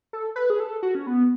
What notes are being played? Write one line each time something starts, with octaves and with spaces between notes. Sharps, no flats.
A4
B4
G#4
A4
F#4
C#4
B3